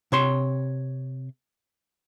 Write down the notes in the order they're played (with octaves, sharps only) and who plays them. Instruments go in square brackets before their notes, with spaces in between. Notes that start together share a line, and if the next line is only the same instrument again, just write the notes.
[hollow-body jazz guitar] C3 C#5 C6